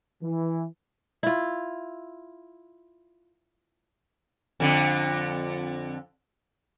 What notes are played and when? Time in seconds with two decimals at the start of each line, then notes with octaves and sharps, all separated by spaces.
0.22 E3
1.23 E4 F4
4.60 F2 D3